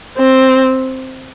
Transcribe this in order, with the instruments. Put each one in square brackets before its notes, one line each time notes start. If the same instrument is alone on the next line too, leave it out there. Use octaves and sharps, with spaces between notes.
[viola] C4